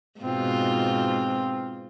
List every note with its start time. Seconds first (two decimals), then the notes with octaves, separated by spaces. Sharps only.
0.20 G#2 B2 C4 F4